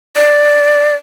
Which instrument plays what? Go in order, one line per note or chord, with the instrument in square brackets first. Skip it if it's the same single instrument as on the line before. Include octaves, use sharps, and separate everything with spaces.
[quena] D5